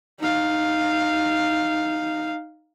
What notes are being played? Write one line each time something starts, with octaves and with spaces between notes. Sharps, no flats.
D#4 F5